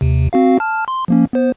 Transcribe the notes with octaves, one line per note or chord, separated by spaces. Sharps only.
D#2 C3
C4 F#4 F5
A5 F6
C6
F3 A#3 C#4
B3 C5